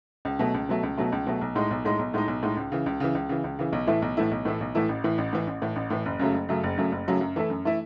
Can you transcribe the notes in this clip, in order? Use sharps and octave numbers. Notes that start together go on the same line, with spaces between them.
C#2
B2 F#3 A3
C#2
B2 F#3 A3
C#2
B2 F#3 A3
C#2
B2 F#3 A3
B1
A2 G#3 D#4
B1
A2 G#3 D#4
B1
A2 G#3 D#4
B1
A2 G#3 D#4
C#2
C#3 E3
C#2
C#3 E3
C#2
C#3 E3
C#2
C#3 E3
B1
A2 E3 A3 E4
B1
A2 E3 A3 E4
B1
A2 E3 A3 E4
B1
A2 E3 A3 E4
A1
A2 E3
A1
A2 E3
A1
A2 E3
A1
A2 E3
F#1
F#2 C#3 F#3 A3
F#1
F#2 C#3 F#3 A3
F#1
F#2 C#3 F#3 A3
F#1
F#2 C#3 F#3 A3
F#2
E3 A3 E4 A4
F#2
E3 A3 E4 A4